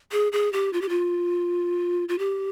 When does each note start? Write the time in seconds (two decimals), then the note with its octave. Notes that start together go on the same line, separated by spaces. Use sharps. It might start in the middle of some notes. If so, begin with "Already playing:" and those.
0.12 G#4
0.32 G#4
0.53 G4
0.73 F4
0.82 G4
0.89 F4
2.09 F4
2.19 G4